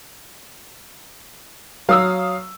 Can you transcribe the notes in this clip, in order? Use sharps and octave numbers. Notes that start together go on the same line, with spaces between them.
F#3 F5 D#6 E6